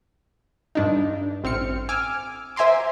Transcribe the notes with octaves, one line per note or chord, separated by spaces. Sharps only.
G2 D4 D#4
A1 C4 F6 C#7
G#5 D6 E6 F6
C5 E5 G#5 A#5 C6 D6